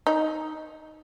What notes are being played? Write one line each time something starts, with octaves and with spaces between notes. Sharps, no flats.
D#4